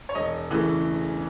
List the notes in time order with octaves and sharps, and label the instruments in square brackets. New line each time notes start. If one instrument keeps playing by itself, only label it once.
[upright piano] C#5
E1 D#5
C#3 E3 A3